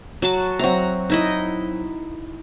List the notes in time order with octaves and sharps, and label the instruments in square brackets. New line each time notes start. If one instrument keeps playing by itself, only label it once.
[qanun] F#3 F#4 A5
[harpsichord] F#3 C4 E5 [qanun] F#4 A#5
[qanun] D#4 E4 D#5